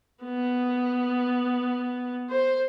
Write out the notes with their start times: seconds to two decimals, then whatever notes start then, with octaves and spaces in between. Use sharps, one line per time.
0.24 B3
2.30 C5